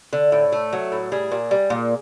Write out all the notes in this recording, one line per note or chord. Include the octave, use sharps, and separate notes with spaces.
D3
A2
A3
F#3
A2
G3 G#4
A#2
G3
A#2